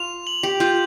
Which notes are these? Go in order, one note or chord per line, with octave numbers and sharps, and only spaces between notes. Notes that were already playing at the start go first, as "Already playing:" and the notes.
Already playing: F4 F7
F#7
G4
F4 G6